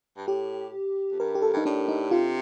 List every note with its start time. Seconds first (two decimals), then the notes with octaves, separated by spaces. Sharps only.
0.17 G2
0.27 A2 G4
1.11 F2
1.20 G2 A#4
1.35 G4
1.42 A4
1.54 G2 D#4
1.65 A2 D4
1.88 D#4
2.11 C3 F4